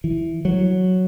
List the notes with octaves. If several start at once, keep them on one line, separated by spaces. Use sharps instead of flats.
E3
F#3